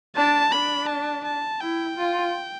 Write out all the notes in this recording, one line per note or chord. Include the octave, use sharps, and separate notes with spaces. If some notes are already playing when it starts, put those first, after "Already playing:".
D4 A5
D4 B5
A5
A5
E4 G5
F4